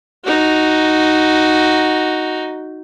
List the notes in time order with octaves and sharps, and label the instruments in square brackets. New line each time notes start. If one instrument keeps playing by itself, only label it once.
[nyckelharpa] D#4 F#4